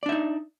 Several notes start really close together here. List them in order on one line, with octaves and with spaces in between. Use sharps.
D5 D4 E5 D#4